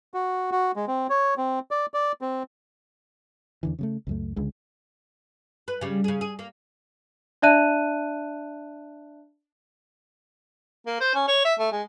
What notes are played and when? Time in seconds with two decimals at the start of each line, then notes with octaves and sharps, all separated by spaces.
0.14 F#4
0.52 F#4
0.76 G#3
0.88 C4
1.10 C#5
1.37 C4
1.71 D5
1.94 D5
2.21 C4
3.63 E2 D3 E3
3.79 C#3 G3 A3
4.07 C#2 F#2 A3
4.36 C#2 D3 G#3
5.68 B4
5.81 C#3 G3
6.04 C#3 G#4
6.21 G#4
6.39 A#3
7.42 D4 D5 E5 A5 F#6 D#7
10.86 A#3
11.01 C5
11.15 C#4
11.28 C#5
11.45 E5
11.59 A3
11.72 G#3